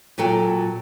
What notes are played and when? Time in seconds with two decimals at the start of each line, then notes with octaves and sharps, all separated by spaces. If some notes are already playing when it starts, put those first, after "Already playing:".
0.18 A#2 F#3 A4 G5